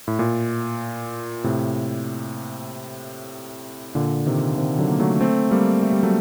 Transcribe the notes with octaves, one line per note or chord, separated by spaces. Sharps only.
A2
A#2
A2 C3
A#2 D3
C3 D#3
C3 D#3
D3 F#3
A#3
F#3 A3
A3 C4
G3 A#3
A3
G3
F#3 A3